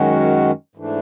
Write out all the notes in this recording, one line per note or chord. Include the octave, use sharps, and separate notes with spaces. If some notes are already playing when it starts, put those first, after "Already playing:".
Already playing: F#2 D#3 G#3 C#4 F#4
G#2 E3 A3 D4